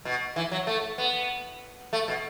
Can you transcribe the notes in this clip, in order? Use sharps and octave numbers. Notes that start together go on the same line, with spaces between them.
B2
E3
F#3
A3
B3
A3
B2